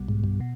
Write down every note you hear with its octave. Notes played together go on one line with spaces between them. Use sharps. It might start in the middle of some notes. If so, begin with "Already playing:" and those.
Already playing: B1 B2 G3 B3
G#2
G2
B2